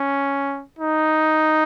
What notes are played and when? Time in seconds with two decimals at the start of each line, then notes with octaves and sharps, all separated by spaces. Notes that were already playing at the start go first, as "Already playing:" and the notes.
Already playing: C#4
0.79 D#4